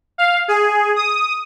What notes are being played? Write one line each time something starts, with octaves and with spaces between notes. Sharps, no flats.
F5
G#4
D#6